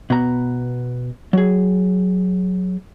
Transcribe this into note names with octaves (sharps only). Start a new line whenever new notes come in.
B2 B3 A#5
F#3 G#4